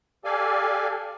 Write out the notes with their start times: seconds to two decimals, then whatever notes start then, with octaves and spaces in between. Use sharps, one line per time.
0.25 G4 A4 D5 F5 G#5